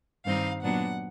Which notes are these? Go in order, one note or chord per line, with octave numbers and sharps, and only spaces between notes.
G2 D#3 G3 C4 D#4 F5
A#2 F#3 B3 D4 F#5